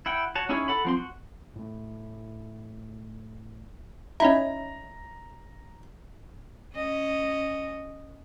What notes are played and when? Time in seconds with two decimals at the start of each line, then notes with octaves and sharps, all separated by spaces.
0.06 E4 F#5 G5
0.35 F#4 C#5 A5
0.49 C#4 D#4 E4 G#4 C#5
0.68 A4 F#5 B5
0.85 F3 C4 C6
0.97 F#4
1.55 A2 A3
4.20 C#4 D#4 E4 A#5
6.75 C#4 D#5